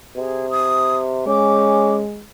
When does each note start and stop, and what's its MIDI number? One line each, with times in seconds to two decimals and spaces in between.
0.16 1.25 48
0.16 0.46 68
0.50 0.97 87
1.27 2.25 56
1.27 2.03 61
1.27 1.94 86